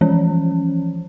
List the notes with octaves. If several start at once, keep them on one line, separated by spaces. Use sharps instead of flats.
E3 F3 C#4